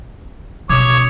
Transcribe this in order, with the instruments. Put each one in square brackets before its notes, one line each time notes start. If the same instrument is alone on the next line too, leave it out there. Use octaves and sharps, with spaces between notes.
[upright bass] B2 C#4 [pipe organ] C#5 [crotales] D6 D#6